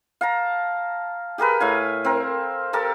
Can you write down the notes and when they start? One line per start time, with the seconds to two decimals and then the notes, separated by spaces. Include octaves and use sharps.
0.21 F5 A5 A#5
1.38 G4 G#4 A#4 B4
1.60 A2 F5 G#5
2.04 C4 A#4
2.73 G4 A4 A#4 A5